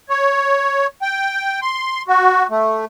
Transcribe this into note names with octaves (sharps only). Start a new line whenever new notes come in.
C#5
G5
C6
F#4
A3